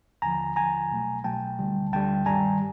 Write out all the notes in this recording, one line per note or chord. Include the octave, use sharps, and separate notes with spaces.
D#2 D3 F3 G#5 A#5
D#2 D3 F3 G#5 A#5
C2 B2 F#3 A3
C2 B2 F#3 A3 G5 A5
D2 D3 G3
D2 D3 G3 G5 A5
G2 D#3 G3 G#5 A#5